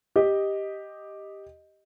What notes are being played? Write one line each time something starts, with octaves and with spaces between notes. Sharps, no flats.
G4 D#5